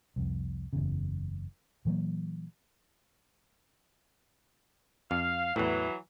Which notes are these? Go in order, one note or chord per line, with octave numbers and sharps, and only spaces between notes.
C2 F2
F#1 E2 C#3
A#2 E3 F#3 A#3
F2 F5
E2 A2 E3 F#3